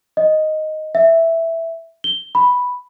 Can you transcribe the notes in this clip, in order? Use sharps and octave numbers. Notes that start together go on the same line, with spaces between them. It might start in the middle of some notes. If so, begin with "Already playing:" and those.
D#5
E5
G7
B5